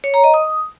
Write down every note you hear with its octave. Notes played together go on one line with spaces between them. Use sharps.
C#5
A#5
D#5
D#6